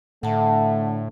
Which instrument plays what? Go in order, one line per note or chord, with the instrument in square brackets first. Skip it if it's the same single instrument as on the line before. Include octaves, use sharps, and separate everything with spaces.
[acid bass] A2 [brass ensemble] D3 A3 [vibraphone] F#5 A5